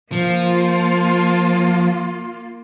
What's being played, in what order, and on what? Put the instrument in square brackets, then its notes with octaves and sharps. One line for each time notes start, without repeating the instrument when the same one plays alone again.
[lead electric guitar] F3 [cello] A#3 F4